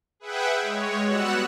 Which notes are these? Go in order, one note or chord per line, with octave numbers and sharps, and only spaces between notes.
G#4 B4 E5 F#5 G5
G#3 C#5
G3 B3 F#4 F#5 E6 F#6